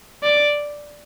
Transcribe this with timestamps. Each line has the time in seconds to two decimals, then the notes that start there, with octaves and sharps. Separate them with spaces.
0.23 D5